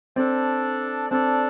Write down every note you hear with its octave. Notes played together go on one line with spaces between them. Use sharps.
C4 D4 A4 D5
C4 D4 A4 D5